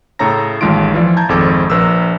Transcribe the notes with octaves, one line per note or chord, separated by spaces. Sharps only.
A2 C#3 A4 C#5 A#5 A#6
A1 D#2 G#3 F4 C6 D7
E3 F3 F4 D5
A5 A#5 G6 G#6
G#1 F2 G#3 A4 D6
A#1 A#4 B4 E6